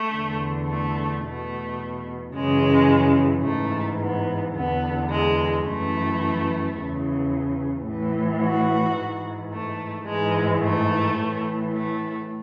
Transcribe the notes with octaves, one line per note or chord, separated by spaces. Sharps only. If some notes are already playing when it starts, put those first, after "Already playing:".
Already playing: A3
E2 D3
A3
E2 B2 A3
F#2 C#3 E3 G#3
G#2 E3 A3
B3
E2 D3 B3
G#3
F#2 E3 A3
E2 C#3 E3
A2 E3
F#4
G#2 E3
A3
G#2 E3 G#3
A3
A2 E3
A3